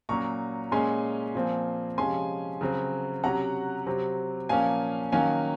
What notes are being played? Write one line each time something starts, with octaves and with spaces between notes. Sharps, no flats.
A#2 F#3 C#4 A#5 C#6
A#2 G#3 C#4 G#5 C6
A#2 F3 C4
C3 F3 G#3 C#4 G#5 C6
C#3 F#3 C4
C3 F#3 C#4 F#5 A#5
C3 F#3 C4
A#2 F3 A#3 C#4 F5 G#5
D#3 F#3 A#3 C#4 F5 G#5